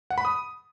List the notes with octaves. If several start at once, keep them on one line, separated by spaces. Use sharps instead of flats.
F#5
B5
D#6